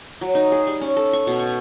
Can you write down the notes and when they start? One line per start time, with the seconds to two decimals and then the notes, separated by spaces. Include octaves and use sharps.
0.21 F#3
0.35 D#4
0.52 G#4
0.67 G3
0.81 C#4
0.97 A4
1.13 C#6
1.27 B2
1.39 C#6